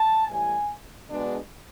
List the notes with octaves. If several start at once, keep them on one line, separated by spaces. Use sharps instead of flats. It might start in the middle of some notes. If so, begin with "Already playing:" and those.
Already playing: A5
A2 E3 G3 G#5
B2 G#3 B3 D4